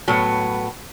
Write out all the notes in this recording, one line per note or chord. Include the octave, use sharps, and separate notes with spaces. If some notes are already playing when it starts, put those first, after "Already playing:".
A2 F#3 B3